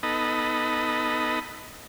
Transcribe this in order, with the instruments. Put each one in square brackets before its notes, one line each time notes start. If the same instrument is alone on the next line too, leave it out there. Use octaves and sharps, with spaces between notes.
[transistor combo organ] B3 D#4 A4 D#5 B5